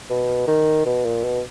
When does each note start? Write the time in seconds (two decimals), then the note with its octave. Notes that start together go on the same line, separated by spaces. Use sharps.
0.10 B2
0.47 D#3
0.85 B2
1.05 A#2
1.23 B2